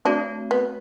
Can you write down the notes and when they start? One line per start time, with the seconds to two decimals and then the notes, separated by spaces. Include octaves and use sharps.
0.05 A3 C4 D4 F#4
0.51 B3